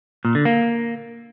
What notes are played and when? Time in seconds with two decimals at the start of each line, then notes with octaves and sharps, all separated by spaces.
0.25 A#2
0.35 D3
0.45 A#3